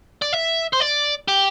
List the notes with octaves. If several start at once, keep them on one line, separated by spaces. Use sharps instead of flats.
D5
E5
C5
D5
G4